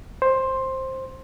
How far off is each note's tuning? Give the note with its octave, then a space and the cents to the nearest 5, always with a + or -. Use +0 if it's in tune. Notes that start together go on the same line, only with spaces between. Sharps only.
C5 +10